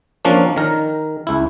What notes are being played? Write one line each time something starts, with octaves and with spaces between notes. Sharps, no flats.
F3 A#3 C#4 D4
D#3 A#4
C#2 E4